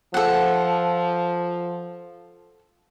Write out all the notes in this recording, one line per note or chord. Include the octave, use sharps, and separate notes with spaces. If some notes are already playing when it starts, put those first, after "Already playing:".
F3 A4 F#5